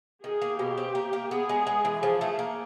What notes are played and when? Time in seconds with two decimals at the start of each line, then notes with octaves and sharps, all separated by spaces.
0.24 D#3 G#4
0.42 A#3
0.59 B2 G4
0.78 C4
0.95 A#3
1.13 A#3
1.31 B3 G#4
1.49 G#3
1.67 G#3
1.85 E3
2.03 F3 G#4
2.21 A3
2.39 A#3